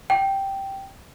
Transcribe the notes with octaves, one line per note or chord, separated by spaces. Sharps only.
G5